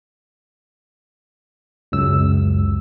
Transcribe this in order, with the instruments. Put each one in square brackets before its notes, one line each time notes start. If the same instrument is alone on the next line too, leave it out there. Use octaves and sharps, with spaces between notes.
[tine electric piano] C#2 F#2 E6